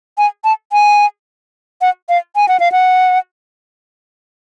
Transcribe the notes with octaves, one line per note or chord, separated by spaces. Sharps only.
G#5
A5
G#5
F#5
F5
G#5
F#5
F5
F#5